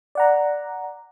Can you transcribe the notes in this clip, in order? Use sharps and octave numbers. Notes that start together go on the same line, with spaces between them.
D5 F#5 A#5